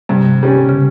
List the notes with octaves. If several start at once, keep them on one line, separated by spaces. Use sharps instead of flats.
G2 C3
G3 C#4
C#3